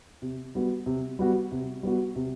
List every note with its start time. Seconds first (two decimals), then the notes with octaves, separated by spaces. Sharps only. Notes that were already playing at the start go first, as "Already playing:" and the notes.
0.22 C3
0.55 G3 B3 F#4
0.86 C3
1.19 G3 B3 F#4
1.52 C3
1.83 G3 B3 F#4
2.16 C3